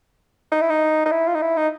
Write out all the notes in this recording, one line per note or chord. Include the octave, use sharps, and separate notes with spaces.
D#4
E4
D#4
D#4
E4
F4
D#4
E4
D#4